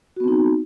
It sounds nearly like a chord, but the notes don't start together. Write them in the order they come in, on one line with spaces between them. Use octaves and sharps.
F#4 B3 C4 D#4